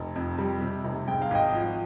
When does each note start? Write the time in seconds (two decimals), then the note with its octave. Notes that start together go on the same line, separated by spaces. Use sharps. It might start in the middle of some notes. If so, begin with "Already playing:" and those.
Already playing: F1
0.16 F2
0.38 G3
0.61 C3
0.85 F1
1.08 G#2 G5
1.22 F5
1.30 G#1 D#5 G5
1.54 F3